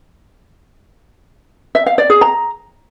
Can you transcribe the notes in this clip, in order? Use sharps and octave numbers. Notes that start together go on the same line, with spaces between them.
E5
F5
D5
G#4
A#5